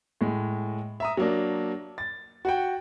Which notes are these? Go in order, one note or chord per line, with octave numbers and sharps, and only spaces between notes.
A2 G#3
E5 A#5 D#6
F#3 A#3 D4
A6
F#4 F#5 G5